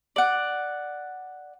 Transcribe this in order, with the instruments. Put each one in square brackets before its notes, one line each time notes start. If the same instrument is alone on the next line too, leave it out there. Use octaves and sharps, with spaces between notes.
[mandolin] D5 F#5